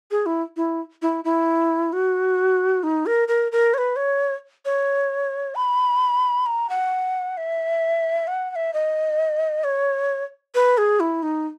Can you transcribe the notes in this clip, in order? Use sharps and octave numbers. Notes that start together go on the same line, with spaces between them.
G#4
E4
E4
E4
E4
F#4
D#4
A#4
A#4
A#4
C#5
B4
C#5
C#5
B5
A#5
F#5
E5
F#5
F#5
E5
D#5
C#5
B4
G#4
E4
D#4